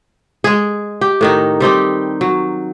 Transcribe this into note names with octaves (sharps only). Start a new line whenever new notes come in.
G#3 G#4
G4
A2 D#3 D#4
G3 C4 D#4 G4
F#3